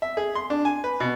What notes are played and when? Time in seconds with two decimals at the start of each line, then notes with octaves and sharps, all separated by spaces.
0.02 E5
0.17 G#4
0.35 C6
0.50 D4
0.65 G#5
0.84 B4
1.00 B2